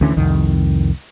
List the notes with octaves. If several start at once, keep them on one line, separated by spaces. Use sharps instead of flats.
D2 D3 E3 C#4
C2 F2 D#3